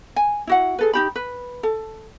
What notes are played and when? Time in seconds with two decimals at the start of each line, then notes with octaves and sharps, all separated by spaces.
0.16 G#5
0.47 E4 F#4 F#5
0.79 G#4 A4 B4
0.93 D#4 G4 B5
1.16 B4
1.63 A4 A5